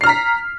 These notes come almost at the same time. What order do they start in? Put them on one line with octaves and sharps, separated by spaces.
C7 F6 A#5 B6